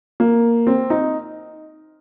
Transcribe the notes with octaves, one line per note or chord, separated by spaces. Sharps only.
A#3
C4
D#4